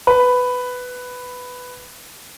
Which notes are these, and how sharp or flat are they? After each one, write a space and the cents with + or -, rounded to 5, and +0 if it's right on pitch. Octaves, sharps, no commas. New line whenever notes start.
B4 +10